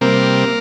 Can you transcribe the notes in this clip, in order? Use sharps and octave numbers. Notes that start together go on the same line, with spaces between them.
C3 G3 A#3 C4 A#4